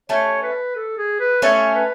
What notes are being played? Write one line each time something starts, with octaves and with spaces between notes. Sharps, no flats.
A3 C#4 C#5
B4
A4
G#4
B4
A3 C#4 C#5
B4